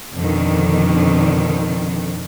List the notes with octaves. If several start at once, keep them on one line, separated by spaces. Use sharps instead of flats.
F2 B2 D3 D#3